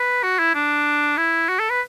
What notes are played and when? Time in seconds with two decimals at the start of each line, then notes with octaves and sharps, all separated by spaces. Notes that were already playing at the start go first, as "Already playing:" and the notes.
Already playing: B4
0.23 F#4
0.39 E4
0.55 D4
1.17 E4
1.49 F#4
1.59 A4
1.70 B4